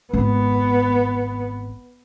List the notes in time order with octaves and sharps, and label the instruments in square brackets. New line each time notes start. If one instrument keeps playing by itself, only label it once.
[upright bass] G#1 [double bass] B3